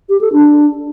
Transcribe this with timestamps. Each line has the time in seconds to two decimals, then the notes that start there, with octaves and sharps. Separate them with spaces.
0.09 G4
0.21 A4
0.32 D4